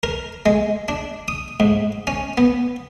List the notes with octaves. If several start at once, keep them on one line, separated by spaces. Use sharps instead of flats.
A#4
G#3
D4
D#6
G#2
C#4
B3